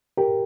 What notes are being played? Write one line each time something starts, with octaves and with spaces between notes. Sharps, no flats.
G4 A#4